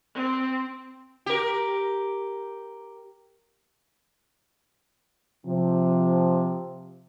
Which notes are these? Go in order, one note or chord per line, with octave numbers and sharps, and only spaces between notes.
C4
G4 A#4
C3 F3